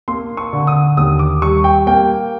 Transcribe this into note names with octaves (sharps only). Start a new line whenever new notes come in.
A#3 C6
C#6
D3
D#6
D#2 D#6
D6
G3 C#6
G5
A#3 G5